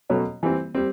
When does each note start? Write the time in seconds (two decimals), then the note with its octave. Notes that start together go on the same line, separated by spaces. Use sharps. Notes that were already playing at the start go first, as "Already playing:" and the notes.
0.10 B2 F#3 A3 C#4
0.43 E3 G3 C4
0.75 G3 C4